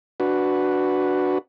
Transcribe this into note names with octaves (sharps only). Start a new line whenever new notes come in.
D4 F#4 B4